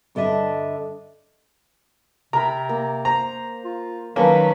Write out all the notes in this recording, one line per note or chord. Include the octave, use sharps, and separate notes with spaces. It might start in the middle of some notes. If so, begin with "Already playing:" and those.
G2 D3 D4 D#5 E5
C3 A#4 A#5 B5
A#3
C5 A#5
F4
D#3 F#3 A#3 C#4 A4 B4